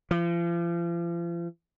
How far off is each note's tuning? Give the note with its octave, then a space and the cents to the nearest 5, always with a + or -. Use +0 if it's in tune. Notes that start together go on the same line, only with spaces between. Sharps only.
F3 -40